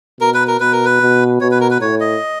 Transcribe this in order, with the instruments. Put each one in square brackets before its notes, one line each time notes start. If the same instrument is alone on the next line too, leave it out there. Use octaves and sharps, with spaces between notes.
[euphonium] B2 [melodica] A#4
[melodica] B4
A#4
[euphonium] B2 [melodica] B4
[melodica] A#4
B4
[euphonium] B2
[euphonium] B2 [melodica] C#5
[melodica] B4
A#4
B4
[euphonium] A2 [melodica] C#5
[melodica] D#5